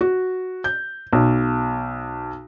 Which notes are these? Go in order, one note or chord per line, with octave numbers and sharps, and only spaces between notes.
F#4
G6
B1